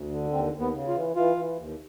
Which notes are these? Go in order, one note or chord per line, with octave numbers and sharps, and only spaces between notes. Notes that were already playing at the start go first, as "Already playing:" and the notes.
Already playing: D2
D3
D#2 C4
D#2
B3
C#3
F4
E3
E3 F4
E3
D#2